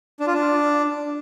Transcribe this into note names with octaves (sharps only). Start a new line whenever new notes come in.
D4
F4
D4